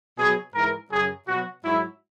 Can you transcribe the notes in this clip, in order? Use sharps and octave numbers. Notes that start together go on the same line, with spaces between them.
B2 F#3 G#4
G#2 E3 A#4
F#2 C#3 F#3 G#4
B2 F#3 F#4
G#2 F#3 E4